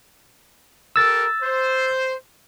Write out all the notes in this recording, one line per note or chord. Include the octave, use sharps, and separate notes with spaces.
G4 A4 A#4 E6 A6
C5